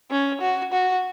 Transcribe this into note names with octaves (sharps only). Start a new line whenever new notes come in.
C#4
F#4
F#4